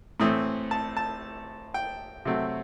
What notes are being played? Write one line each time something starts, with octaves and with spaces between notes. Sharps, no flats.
A2 E3 A3 C4 D#6
A5
A5
G5
C3 F#3 A3 C4